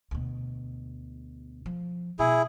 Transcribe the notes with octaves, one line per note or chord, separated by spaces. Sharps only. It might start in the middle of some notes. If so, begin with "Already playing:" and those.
D2 B2
F3
B2 E4 G#4